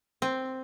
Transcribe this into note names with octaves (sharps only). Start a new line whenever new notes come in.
C4